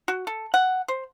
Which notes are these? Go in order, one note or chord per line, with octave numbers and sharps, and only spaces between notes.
F#4
A4
F#5
C5